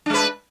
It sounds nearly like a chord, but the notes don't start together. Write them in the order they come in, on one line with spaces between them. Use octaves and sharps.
D4 G#3 B4